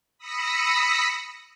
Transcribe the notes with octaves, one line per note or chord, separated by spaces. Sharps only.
B5 D#6 E6 A#6 B6 C#7